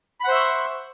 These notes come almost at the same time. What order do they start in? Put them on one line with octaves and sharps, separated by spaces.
B5 F#5 C5 E5 C#6